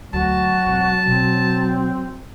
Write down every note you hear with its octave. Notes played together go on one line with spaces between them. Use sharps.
D2 F#3 F#4 A5
E1 C4
B2 B3 C4